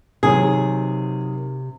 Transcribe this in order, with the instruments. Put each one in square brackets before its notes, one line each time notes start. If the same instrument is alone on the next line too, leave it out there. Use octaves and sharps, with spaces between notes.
[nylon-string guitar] C3 [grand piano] D#3 F#3 [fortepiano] G#4